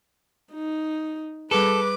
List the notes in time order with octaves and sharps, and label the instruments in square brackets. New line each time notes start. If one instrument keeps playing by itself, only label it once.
[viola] D#4
[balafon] G3 G#4 [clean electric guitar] A4 [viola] B4 [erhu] D6